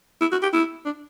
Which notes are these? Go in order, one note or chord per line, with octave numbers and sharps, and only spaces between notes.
E4
F#4
G4
E4
D4